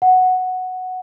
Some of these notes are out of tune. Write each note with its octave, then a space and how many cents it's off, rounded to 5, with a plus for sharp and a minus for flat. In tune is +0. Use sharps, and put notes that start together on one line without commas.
F#5 +0